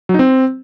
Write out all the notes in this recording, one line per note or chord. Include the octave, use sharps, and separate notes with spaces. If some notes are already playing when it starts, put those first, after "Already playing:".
F#3
D#4
C4